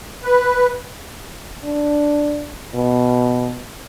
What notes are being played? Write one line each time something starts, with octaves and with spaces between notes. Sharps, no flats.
B4
D4
B2